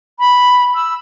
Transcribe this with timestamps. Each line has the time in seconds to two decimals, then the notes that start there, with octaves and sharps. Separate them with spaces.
0.19 B5
0.75 E6